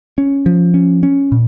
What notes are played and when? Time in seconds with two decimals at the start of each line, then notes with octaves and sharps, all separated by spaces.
0.18 C#4
0.46 F3
0.74 C#4
1.03 C#4
1.32 A#2